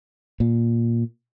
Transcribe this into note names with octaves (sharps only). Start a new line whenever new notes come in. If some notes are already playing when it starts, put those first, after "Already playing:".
A#2